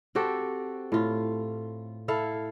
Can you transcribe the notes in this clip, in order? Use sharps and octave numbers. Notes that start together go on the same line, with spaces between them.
C4 F#4 G4 A4
A2 F4
E4 A4 F5